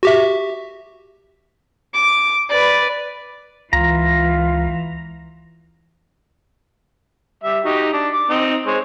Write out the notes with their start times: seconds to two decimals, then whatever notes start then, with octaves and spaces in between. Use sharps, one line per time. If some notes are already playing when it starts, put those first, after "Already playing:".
0.03 F#4 G4 E5
1.93 D6
2.49 B4 D5
3.73 C#2 E3 F4 A#5
7.44 G3 E5
7.65 D#4 F#4 G4
7.93 D4
8.13 D6
8.30 C4 D#4
8.67 G#3 C5 C#5